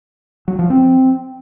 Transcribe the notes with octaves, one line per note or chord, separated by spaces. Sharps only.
F#3
F3
C4